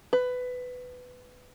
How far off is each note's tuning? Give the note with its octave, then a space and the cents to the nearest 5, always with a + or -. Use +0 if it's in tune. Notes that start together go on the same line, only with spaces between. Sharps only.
B4 +15